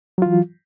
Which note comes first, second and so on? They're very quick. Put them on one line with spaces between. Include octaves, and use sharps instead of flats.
F#3 F4 E3